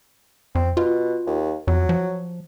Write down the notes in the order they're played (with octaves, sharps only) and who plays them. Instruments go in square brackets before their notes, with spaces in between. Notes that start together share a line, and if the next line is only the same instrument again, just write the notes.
[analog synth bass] F2 [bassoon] C4
[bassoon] B2 [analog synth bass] F4
[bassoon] D#2
[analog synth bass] F2 [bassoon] F#3
[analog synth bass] F3